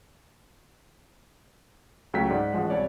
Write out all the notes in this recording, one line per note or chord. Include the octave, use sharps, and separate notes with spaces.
C#2 F#3 A3 G5 B6
G#2 D5 F#5
A1 F3 G#3 F#5
C2 C#5 D5